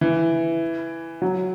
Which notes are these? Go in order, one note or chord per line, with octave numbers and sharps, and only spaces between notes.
E3
F#3